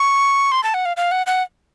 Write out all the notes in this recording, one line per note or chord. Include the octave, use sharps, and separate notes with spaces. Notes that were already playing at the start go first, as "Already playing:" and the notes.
Already playing: C#6
C6
A5
F#5
F5
F5
F#5
F#5